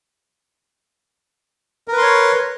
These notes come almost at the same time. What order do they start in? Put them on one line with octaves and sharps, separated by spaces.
A#4 B4 C6 C#5